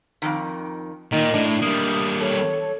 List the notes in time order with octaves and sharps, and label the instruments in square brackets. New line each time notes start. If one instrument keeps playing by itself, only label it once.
[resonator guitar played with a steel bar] F2 G#2 D#3
[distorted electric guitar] A#2 [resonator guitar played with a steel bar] D#3 [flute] D#5
[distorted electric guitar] A2 [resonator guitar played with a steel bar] D4
[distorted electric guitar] G3 A#3 [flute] D#6
[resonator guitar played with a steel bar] A4 [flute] C#5